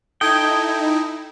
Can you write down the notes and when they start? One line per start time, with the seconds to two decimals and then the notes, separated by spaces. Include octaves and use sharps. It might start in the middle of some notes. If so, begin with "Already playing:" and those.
0.21 D#4 E4 A4 G5 D#6 G#6